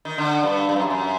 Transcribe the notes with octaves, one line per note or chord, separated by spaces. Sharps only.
D#3
D3
G2
G2
F#2
F#2